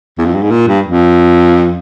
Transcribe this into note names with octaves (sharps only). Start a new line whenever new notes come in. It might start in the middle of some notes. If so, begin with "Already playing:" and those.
E2
F2
G2
G#2
A#2
G2
F2